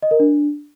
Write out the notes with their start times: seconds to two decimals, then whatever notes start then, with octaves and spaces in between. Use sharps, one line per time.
0.03 D#5
0.11 A#4
0.20 D4